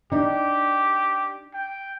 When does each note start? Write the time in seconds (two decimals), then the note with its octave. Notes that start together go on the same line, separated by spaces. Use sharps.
0.12 D4 D#4 G4
1.54 G5